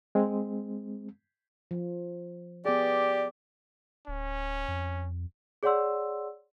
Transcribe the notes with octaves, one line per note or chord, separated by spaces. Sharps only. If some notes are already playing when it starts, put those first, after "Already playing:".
G#3 C4
F3
B3 G4 G#4 D5
D1 C#4
F2
G#4 C#5 D5 F#5 C6 E6